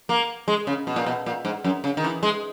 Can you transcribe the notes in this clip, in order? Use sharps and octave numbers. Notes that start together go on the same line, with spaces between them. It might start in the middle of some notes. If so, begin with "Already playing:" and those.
A#3
G#3
C#3
B2
A#2
B2
A#2
G#2
F#2
C#3
D#3
E3
G#3